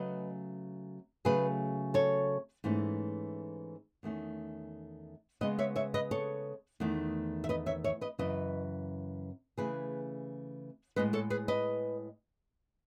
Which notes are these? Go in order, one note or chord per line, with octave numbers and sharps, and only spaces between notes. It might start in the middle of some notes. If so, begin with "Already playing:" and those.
Already playing: C#3 F#3 A3 C#4 B4 D#5
C#3 F#3 A3 C#4 G#4 B4
A4 C#5
G#2 E3 A3 C#4
E2 D#3 A3 C#4
C#3 G#3 B3 B4 D#5
C#5 E5
C#5 E5
B4 D#5
A4 C#5
E2 D#3 A3
E5
B4 D#5
C#5 E5
C#5 E5
B4 D#5
F#2 C#3 E3 B4 D#5
C#3 E3 A3 C#4 G#4 B4
A2 G#3 B3 B4 D#5
A4 C#5
G#4 B4
B4 D#5